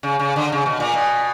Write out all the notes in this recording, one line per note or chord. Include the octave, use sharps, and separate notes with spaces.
C#3
C#3
D3
C#3
B2
A#2
B2